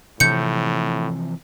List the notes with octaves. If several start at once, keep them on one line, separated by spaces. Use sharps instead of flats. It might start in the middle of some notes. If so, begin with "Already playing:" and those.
A2 C3 E3 F3 G6 C#7